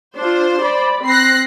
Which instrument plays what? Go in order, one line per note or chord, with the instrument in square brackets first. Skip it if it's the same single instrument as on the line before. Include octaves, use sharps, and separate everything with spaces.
[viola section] D4 F4 [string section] C5
[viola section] D5 B5
[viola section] C4 [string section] F#6 A#6 C7